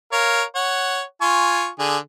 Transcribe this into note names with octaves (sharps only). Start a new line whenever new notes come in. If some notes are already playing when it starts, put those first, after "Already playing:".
A#4 C#5 F5
C#5 F#5
F4 G#5 C#6
D3 G#4